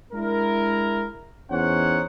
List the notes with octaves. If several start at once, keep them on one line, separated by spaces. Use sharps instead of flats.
G#3 D4 E4 A#4
E2 C#4 D#4 C5 C#5 F#5